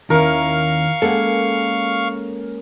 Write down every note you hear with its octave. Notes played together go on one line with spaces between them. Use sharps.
D#2 D#3 C#4 E4 A#4 F5 C#6
G#3 A#3 C#4 A4 F#5